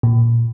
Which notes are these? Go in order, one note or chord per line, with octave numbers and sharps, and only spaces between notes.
A#2